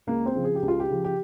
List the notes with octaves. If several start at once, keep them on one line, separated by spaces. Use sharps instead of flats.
C#2 A#3
C4
C#3 F3
G#4
G4
C#2
F4
G4
C#3 F3
G4